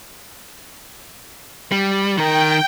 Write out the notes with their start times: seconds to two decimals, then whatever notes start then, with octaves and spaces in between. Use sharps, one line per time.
1.72 G3
2.18 D#3 A#4 G5